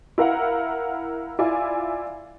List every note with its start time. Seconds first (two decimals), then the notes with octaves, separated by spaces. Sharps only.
0.18 E4 A#4 F5 F#5
1.39 E4 F4 D5 G#5